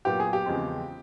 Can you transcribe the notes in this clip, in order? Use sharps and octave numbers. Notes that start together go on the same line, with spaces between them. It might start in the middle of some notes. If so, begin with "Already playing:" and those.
A#2 F#3 B3 G4
G#4
G4
E2 C#3 F3 G#3 C4